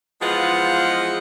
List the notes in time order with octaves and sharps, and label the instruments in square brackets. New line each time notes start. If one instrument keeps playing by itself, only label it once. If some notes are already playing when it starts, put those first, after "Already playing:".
[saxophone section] E3 F3 G#3 B3 F4 F#5